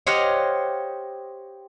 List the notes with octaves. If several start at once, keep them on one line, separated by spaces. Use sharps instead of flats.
G4 C5 C#5 D#5 F5 F#5